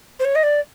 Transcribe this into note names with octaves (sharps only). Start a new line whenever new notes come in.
C5
C#5
D#5
D5